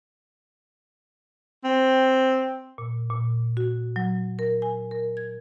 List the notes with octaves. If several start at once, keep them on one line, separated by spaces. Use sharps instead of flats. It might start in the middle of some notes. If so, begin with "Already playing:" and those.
C4
A#2
A#2
F#4
F#3
A#4
G#5
A#4
G#6